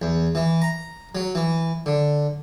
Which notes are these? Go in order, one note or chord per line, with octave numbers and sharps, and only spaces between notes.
E2
E3
A#5
F#3
E3
D3